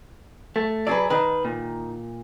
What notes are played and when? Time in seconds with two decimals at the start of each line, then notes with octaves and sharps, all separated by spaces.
0.56 A3
0.87 F#3 G#4 B4 D5
1.10 D#3 B4
1.45 A#2